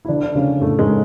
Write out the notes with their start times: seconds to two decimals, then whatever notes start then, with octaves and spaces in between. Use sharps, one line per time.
0.05 E4
0.09 D3 D4
0.23 D4
0.35 C#3 C#4
0.61 A2 A3
0.79 G#2 G#3